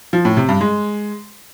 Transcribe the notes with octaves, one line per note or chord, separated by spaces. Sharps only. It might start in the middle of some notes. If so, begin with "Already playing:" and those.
F3
A2
C3
G2
G#3